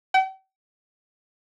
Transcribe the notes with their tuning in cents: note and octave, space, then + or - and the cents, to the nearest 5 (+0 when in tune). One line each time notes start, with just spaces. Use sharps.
G5 -45